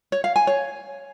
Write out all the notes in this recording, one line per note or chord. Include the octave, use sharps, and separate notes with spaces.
C#5
F5
G#5
C#5